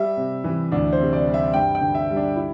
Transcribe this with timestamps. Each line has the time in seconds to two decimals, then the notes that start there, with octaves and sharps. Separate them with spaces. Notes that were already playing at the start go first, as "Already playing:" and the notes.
Already playing: G3 E5
0.17 C3
0.44 E3
0.72 D2 D4
0.93 C5
1.00 C3
1.13 D5
1.27 G3
1.34 E5
1.54 G2 G5
1.75 G5
1.81 D3
1.95 E5
2.09 G3
2.16 D4
2.36 E4